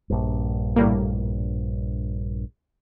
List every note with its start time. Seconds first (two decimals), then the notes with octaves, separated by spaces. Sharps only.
0.10 A#1 G2
0.76 A2 G3 A#3